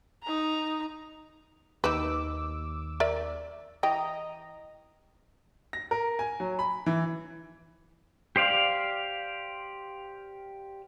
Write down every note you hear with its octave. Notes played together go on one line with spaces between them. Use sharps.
D#4 A#5
D#2 D#4 B4 D6 E6
A#4 D5 E5
E3 D#5 G5 A#5 D#6
A#6
A#4
G#5
F#3
B5
E3
G4 C5 D5 F5